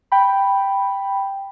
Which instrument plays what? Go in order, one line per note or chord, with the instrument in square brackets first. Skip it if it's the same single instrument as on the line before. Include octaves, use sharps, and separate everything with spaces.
[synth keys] G5 B5